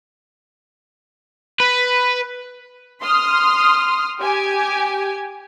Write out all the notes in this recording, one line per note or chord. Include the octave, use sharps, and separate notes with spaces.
B4
C6 D#6 F6
G4 G#5